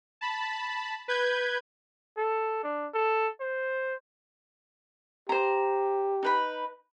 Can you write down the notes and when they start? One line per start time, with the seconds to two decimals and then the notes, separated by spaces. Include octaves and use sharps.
0.21 A5 B5
1.08 B4 G6 G#6
2.17 A4
2.64 D4
2.94 A4
3.41 C5
5.29 G4 C5 A#5
6.23 D#4 B4 B5